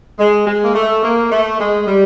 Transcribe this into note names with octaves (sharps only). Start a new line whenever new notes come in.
G#3
G#3
A#3
A3
A#3
A3
G#3
G3